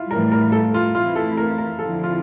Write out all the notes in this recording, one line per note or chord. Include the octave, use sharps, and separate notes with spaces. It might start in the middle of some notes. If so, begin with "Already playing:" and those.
Already playing: E4 F4
A2 E3 G3 A#4
A#4
A4
F4
E3 A3 C4 E4 F4
A4
A#4
A#4
D3 F3 C4 E4 A4
F4